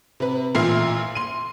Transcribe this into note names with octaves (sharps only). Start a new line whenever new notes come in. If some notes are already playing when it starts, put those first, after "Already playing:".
C3 B4
A1 A#2 E5 C6 F6 C7
C6 D#7